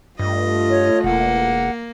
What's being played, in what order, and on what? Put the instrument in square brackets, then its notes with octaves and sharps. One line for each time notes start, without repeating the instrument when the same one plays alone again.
[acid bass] G2 [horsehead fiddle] A3 F4 [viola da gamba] D#5
[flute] C#5
[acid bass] E1 [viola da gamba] A#3 [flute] F#5